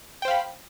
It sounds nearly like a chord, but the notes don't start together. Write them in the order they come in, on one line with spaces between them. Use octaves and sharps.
G5 C5 F5 B5